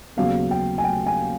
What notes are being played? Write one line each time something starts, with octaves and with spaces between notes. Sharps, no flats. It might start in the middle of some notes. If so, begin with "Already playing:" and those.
D#2 C#3 F#3 B3 F5
G5
G#5
G5
G#5